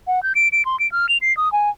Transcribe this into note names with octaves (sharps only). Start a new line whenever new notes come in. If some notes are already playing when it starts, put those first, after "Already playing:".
F#5
G6
D7
D7
C6
D7
F6
F7
C7
D#6
G#5